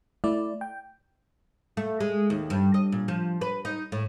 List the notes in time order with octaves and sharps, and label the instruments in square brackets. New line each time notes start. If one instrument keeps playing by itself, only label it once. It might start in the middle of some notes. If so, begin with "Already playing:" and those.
[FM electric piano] A3 E4 D5
G5
[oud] A3
G#3
D#2
G2
D#5
A#2
F3
B4
D#4
A2